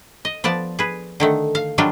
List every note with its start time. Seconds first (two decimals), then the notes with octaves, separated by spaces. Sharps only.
0.25 D#5
0.44 F3 B3 D5 A5
0.79 G#4 B4
1.20 D3 D#3 A3
1.55 F5
1.78 D#3 F#3 G3 D4 F4